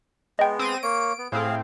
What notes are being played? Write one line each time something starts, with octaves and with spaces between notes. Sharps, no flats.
G#3 B3 D#5 G5
C4 A#6 D#7
A#3 C#5 D7
B3
A2 C4 G#4 F5